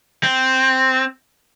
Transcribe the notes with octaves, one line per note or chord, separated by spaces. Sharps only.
C4